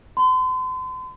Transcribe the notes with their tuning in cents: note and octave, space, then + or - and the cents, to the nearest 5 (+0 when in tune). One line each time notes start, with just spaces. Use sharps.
C6 -40